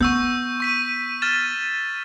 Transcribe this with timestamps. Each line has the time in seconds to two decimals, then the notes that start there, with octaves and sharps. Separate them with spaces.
0.01 B3 C#6 E6 G6
0.60 C#6 B6 D#7
1.22 F6 A6 E7